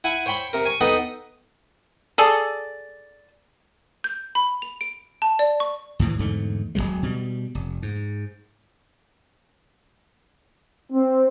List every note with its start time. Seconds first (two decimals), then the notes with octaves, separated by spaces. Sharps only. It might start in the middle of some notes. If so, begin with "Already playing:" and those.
0.04 E4 F#5 G#5
0.26 C5 C#5 G5 B5 C6
0.53 C3 A#4
0.66 G#5 C#6
0.81 B3 D#4 A4 B4 D#5 G5
2.18 G#4 A4 D5
4.04 G6
4.35 B5
4.62 F7
4.81 D7
5.22 A5
5.39 D5
5.60 C#6
5.99 D#2 A2 E3
6.19 E2 G#2 D3 A3
6.75 D1 F#2 F#3 G#3
7.03 B2 G3
7.55 F1
7.82 G#2
10.92 C4